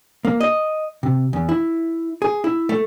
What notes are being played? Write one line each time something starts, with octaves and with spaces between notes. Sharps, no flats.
A#3
D#5
C3
E2
E4
G#4
E4
A3